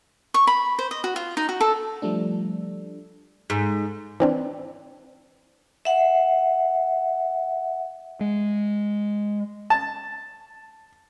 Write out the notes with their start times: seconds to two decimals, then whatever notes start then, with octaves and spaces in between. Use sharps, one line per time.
0.34 C#6
0.47 B5
0.79 C5
0.91 D#5
1.04 F#4
1.16 F4
1.37 D#4
1.49 F#4
1.61 A4
2.02 F3 G3 A3 D4
3.50 G#2
4.20 E3 C4 D4
5.85 E5 F#5
8.20 G#3
9.70 A5